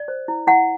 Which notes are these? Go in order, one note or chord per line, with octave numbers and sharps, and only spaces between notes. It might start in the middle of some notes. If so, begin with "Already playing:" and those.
Already playing: D5
C5
E4
E4 F#5